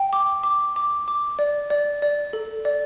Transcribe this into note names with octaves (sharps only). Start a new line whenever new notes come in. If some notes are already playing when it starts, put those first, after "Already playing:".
Already playing: G5
D6
D6
D6
D6
D5
D5
D5
A4
D5